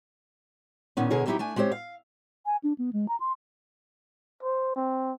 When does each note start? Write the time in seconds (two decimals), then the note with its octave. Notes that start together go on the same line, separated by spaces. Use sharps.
0.97 A#2 D#3 B3 C#4
1.10 B2 D3 G#4 A#4 C#5
1.26 F#3 G3 C4 D#4 E4 G4
1.39 A3 D4 G#5
1.56 G#3 C4 G4 C5 C#5
1.72 F5
2.46 G#5
2.64 D4
2.78 B3
2.93 G#3
3.08 A#5
3.20 C6
4.43 C5
4.75 C4